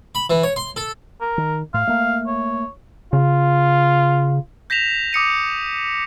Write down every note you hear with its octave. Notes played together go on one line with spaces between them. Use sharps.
B5
E3
C#5
C6
A4
A#4
D#3
A2 F5
A3 A#3
C#5
C#3 F4
G6 A#6 B6 E7 F7
D6 D#6 C#7 D#7